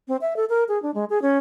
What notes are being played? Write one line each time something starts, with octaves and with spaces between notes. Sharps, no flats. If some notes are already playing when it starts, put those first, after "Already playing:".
C4
E5
A4
A#4
G#4
D4
G#3
G#4
C#4